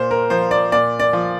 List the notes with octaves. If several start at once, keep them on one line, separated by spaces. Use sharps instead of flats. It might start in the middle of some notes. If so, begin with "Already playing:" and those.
Already playing: A#2 C5
A#4
F3 C5
D5
A#2 D5
D5
F3